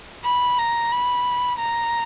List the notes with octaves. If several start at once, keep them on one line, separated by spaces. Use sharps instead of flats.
B5
A#5
B5
A#5